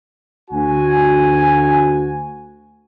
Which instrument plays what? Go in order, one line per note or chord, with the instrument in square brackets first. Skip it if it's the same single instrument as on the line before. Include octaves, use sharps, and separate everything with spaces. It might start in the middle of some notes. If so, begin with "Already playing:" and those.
[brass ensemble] D2 F#4 G#5